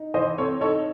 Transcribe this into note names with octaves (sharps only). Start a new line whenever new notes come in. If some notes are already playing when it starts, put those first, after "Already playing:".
Already playing: D#4
E3 C5 D#5
C4 A4 C#5
D#4 A4 C#5